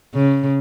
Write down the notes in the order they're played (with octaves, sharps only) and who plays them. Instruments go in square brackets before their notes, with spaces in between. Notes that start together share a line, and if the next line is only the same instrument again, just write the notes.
[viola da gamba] C#3